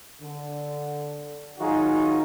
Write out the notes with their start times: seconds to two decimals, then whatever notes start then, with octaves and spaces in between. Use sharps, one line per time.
0.22 D3
1.59 D#3 F#3 D#4 F4 F#4 G#4